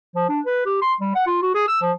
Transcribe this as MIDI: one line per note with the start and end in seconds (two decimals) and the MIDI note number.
0.16 0.29 53
0.29 0.40 62
0.46 0.63 71
0.66 0.81 67
0.82 0.94 84
1.01 1.11 55
1.15 1.24 78
1.27 1.38 65
1.42 1.54 66
1.54 1.66 68
1.68 1.77 88
1.82 1.92 53